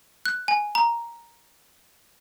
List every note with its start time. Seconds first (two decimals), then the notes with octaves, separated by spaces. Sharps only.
0.26 F#6
0.48 G#5
0.75 A#5